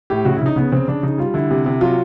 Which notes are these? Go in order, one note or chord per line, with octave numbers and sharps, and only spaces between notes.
A2 G4
C#3 F#4
E4
C#3 D#4
C#3 B3
C#3 C4
C#3 D4
C#3 D#4
G3 F4
D3 E4
C3
C3
F#3 F4